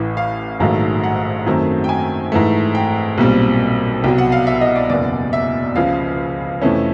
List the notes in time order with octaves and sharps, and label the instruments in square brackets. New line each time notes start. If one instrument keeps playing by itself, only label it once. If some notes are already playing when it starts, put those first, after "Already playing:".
Already playing: [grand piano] A1 A2 E3
F5
A#1 G#2 D#3 F#3 A3 F5
F#5
F#2 D#3 F#3 A3 C4
G5
G#5
G#2 E3 A3
G5
B1 A#2 G3 C4
C2 B2 F#3 G5
F#5
F5
E5
D#5
D5
F#1 E2 B2 D5
E5
C#2 C#3 F3 F5
F2 C3 E3 A3 C#4